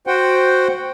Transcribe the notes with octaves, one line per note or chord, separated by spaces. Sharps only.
F#4 C5 F#5 G5